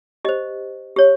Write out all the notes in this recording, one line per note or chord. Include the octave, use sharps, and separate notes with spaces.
G4 C5 D#5
G4 C#5